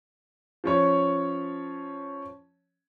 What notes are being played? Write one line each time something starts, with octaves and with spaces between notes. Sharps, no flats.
F3 C#4 C#5